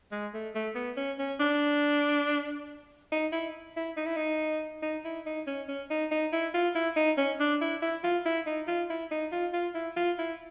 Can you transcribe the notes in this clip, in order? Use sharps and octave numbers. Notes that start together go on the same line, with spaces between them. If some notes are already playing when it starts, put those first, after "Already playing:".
G#3
A3
A3
B3
C#4
C#4
D4
D#4
E4
E4
D#4
E4
D#4
D#4
E4
D#4
C#4
C#4
D#4
D#4
E4
F4
E4
D#4
C#4
D4
E4
E4
F4
E4
D#4
F4
E4
D#4
F4
F4
E4
F4
E4